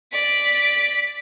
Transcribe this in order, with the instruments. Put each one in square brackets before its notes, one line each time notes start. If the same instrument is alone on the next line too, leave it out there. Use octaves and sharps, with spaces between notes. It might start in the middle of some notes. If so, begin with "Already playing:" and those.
[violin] D5 B6